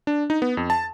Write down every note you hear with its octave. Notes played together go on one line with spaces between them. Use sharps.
D4
D#4
B3
F2
A5